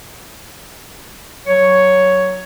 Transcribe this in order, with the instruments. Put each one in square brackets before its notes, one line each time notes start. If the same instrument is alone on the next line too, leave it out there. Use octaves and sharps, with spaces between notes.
[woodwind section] F#3 C#5